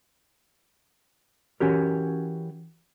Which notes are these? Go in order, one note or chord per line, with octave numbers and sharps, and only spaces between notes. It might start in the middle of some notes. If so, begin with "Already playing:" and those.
E3 C#4 F#4 G4 A#4